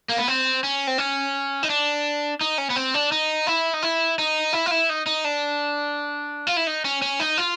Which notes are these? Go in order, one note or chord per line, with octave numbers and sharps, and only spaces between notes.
A#3
B3
C4
C#4
C4
C#4
D#4
D4
D#4
C#4
B3
C4
D4
D#4
E4
D#4
E4
D#4
E4
F4
E4
D#4
D#4
D4
F4
E4
D#4
C#4
C#4
D#4
F4